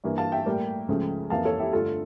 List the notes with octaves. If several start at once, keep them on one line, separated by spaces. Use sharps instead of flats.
G2 E3 A#3
F5 A5
E5 G5
A2 G3 A#3
C#2 C#3 F3 A3
F2 E3 A#3 F5 A5
A4 C#5
E4 G4
G2 D3 A3 F4 A4